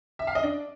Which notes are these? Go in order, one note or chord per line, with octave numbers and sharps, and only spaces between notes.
E5
F5
D#5
D4